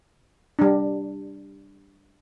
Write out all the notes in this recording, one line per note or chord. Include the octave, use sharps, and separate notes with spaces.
G3 D4